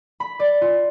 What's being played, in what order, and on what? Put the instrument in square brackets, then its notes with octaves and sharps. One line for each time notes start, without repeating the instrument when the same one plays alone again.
[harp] B5
D5
F4